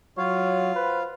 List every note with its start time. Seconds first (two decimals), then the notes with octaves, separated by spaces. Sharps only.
0.18 F#3 F4 C#5 F5
0.76 B4 C5